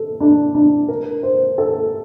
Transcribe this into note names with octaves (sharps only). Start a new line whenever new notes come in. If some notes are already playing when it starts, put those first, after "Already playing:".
Already playing: A4
D4
D4
A#4
C5
A4